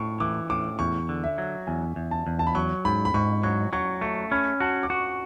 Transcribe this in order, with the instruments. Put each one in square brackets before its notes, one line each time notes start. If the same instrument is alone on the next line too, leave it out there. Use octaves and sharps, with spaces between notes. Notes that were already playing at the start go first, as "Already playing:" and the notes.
Already playing: [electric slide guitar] A2 [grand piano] C#6
[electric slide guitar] E3 [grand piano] D6
[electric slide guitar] A2 [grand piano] D6
[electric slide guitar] E2 [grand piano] C#6
[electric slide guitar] D3
[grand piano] E5
[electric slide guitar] F#3
[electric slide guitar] E2 [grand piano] G#5
[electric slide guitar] E2
[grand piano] A5
[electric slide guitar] E2
[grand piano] A5
B5
[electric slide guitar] F#3 [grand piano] C#6
[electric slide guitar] G#2 [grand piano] B5
[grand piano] B5
[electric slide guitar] G#2 [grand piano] C#6
[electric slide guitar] F#3 [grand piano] C#6
[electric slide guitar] F#3 [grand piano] C#6
[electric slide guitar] A3 [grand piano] C#6
[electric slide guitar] C#4 [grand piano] B5
[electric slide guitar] F#4 [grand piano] A5
[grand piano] D6
[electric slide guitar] F#4 [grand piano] C#6